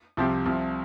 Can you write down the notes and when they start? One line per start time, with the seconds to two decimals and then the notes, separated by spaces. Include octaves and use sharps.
0.17 C2 C3 F3 C4 G4
0.46 C2 C3 F3